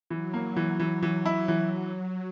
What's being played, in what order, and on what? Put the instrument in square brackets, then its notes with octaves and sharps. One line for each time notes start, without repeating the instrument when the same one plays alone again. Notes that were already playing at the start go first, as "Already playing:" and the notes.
[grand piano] E3 [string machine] F#3
[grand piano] A#3
E3
E3
E3
E4
E3